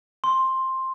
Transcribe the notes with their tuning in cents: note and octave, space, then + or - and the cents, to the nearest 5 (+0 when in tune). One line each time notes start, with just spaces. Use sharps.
C6 +10